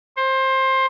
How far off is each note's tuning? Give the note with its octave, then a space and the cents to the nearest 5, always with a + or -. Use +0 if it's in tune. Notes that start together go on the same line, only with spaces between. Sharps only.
C5 +20